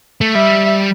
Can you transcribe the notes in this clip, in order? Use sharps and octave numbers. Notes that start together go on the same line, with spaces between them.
A3
G3 E5